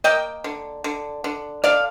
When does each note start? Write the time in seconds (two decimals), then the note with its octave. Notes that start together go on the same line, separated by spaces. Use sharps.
0.04 A#3 D#5 G5
0.44 D3
0.84 D3
1.24 D3
1.64 D3 D5 F5